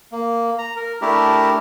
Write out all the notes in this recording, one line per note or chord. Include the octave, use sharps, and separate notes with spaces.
A#3
A#5
A#4
A3 D4 E4 G4 A#4